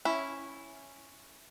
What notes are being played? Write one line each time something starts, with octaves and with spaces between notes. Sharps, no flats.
C#4 E4